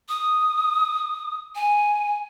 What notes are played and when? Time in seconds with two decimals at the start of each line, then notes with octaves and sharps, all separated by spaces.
0.09 D#6
1.55 G#5